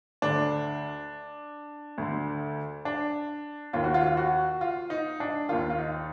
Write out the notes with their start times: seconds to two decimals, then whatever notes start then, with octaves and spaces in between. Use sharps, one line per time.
0.22 D2 D3 D4
1.98 D2 D3
2.85 D4
3.73 D#2 D#3 F4
3.84 F#4
3.94 F4
4.06 F4
4.17 F#4
4.61 F4
4.90 D#4
5.20 D4
5.49 D#2 D#3 F4
5.70 F4
5.78 D#4